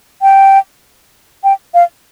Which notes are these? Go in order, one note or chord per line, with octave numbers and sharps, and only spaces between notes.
G5
G5
F5